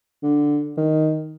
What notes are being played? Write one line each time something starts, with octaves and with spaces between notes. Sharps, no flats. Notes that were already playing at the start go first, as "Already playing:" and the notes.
D3
D#3